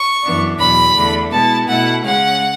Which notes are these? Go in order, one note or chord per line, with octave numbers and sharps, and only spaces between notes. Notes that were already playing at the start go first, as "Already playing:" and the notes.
Already playing: C#6
F#2 E3 B3 D4
E2 B2 F#3 B5
E2 D3 A3 D4
B2 G#3 B3 E4 A5
B2 A3 E4 F#5
C#3 G#3 C#4 F#5